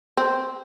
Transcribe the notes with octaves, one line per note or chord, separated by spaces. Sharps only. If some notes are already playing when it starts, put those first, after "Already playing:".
C4